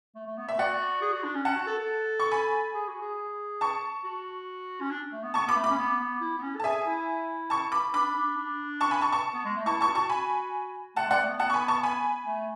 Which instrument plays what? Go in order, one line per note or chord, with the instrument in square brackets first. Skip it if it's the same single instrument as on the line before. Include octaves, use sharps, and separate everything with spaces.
[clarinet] A3
A3
B3
[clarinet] A3 [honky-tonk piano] E5
[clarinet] F#4 [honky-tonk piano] D5 F#5
[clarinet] G#4
F#4
D4
C#4
[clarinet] C#4 [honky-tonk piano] F#5 A5
[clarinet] F#4
A4
A4
[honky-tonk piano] C#6
G#5 B5
[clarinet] G#4
F#4
G#4
[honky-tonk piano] A5 C#6
[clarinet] F#4
C#4
D4
A3
B3
[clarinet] B3 [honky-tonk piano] A5 C#6
[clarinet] B3 [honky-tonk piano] B5 D6
[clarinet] A3
[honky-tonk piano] B5 D6
[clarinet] C#4
B3
B3
E4
B3
C#4
A4
[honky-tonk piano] A5
[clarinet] G#4 [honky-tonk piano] E5 G#5
[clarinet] E4
[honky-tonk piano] A5 C#6
B5 D6
[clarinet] D4 [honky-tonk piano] B5 D6
[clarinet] D4
D4
[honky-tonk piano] A5 C#6
G#5 B5
A5 C#6
A5 C#6
[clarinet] B3
G#3
A3
[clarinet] E4 [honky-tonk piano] A5 C#6
[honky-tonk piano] A5 C#6
[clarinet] F#4
[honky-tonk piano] A5 C#6
G#5 B5
[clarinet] A3 [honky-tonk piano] F#5 A5
[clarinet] G#3 [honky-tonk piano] D5 F#5
[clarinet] A3
B3
[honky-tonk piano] F#5 A5
C#6
G#5 B5
A5 C#6
G#5 B5
[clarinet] A3